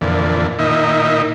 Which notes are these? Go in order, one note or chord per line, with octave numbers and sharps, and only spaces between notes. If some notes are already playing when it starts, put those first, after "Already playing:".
F2 A#2 D3 E3
A#2 D#3 D#4 E4